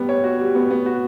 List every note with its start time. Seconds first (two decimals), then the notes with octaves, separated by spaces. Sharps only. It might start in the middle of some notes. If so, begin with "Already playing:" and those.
Already playing: G3 B3
0.09 C#5
0.24 F#4
0.39 G3
0.55 B3
0.71 B3
0.86 F#4